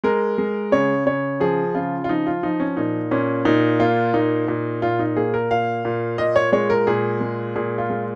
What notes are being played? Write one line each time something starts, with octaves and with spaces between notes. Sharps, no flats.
G#3 A#4
G#3
C#3 C#5
C#3 C#5
F3 G#4
C#3 F4
F4
F3 D#4
F4
F3 D#4
C#4
A#2 D#4
A#2 C#4
A#2 D#4
A#3 F4
A#2 D#4
A#2
A#2 F4
D#4
A#3 G#4
A#4
A#2 F5
A#2
A#2 D#5
C#5
G#3 C#5
A#4
A#2 G#4
G#3
A#2 G#4
F4
G#3